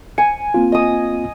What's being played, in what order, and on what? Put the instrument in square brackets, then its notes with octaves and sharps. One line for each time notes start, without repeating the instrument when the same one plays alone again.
[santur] G#5 [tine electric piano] C#7
[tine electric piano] A#3 C4 F4
[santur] D#5 D#6